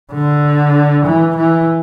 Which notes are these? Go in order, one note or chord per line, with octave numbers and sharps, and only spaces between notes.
D3
E3
E3